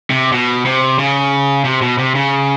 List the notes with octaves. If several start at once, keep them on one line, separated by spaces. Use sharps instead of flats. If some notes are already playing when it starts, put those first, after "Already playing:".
C3
B2
C3
C#3
C3
B2
C3
C#3